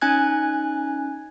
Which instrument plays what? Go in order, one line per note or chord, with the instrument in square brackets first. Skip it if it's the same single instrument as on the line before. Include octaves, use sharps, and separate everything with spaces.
[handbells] C#4 D#4 G#5 F#6 G#6